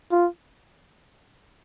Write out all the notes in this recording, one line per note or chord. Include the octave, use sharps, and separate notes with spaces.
F4